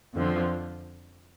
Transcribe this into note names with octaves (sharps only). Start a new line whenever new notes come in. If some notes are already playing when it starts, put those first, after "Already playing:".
F2 D3 F3